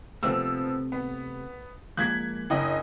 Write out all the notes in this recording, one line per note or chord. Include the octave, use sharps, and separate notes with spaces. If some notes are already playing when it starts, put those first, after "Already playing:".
C3 F3 A3 B3 C4 E6
B3
F3 G#3 A#3 F#6 G#6 B6
F#1 D4 E4 D#5